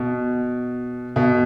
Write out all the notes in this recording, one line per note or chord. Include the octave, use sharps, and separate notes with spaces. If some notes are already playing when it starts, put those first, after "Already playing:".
Already playing: B2
B2